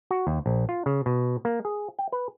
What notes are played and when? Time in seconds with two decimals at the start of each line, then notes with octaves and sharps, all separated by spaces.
0.11 F#4
0.27 D#2
0.46 A#1
0.69 F4
0.86 C#3
1.06 B2
1.45 A#3
1.65 G#4
1.99 G5
2.12 B4